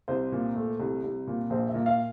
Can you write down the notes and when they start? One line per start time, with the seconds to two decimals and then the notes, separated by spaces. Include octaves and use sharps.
0.08 C2 C5
0.32 A#2
0.55 A3
0.80 C2
1.03 C2
1.27 A#2
1.50 A#1 C5
1.68 E5
1.74 A#2
1.86 F5